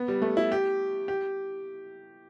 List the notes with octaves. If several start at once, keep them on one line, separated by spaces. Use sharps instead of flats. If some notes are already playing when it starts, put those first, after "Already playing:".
Already playing: B3
G3
A3
E4
G4
G4